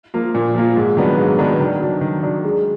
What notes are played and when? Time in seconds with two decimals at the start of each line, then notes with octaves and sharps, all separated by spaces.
0.14 F3 A#3 F4
0.35 A#2
0.55 F3 A#3 F4
0.76 G#2
0.97 D#3 F#3 B3 D4
1.18 G#2
1.39 D#3 F#3 B3 D4
1.60 D#3
1.80 F#3 D4
2.01 D#3
2.23 F#3 D4
2.44 G#3